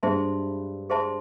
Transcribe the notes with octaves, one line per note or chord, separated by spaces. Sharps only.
G2 G#4 C5 E5 A5 C6
G#4 C5 E5 A5 C6